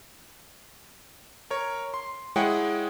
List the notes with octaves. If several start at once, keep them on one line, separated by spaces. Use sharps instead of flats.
A#4 C#5
C6
G#3 E4 G#4 C#5 F#5 G5